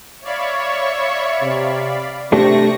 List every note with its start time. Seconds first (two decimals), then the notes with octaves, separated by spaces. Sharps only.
0.24 C#5 D5 E5 F5 B5 C#6
1.42 C3
2.32 C3 A3 C4 D4 G4 C#6 A#6